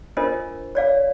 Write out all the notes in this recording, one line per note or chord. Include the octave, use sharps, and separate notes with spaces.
D4 F4 A4 A#4 C5 D#5
C#5 D5 F5